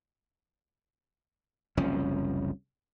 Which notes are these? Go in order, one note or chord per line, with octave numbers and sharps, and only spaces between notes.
F#1 C2 F3 C#4